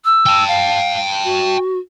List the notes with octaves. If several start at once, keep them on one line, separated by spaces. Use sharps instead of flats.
E6
G5 A5
F5
F#4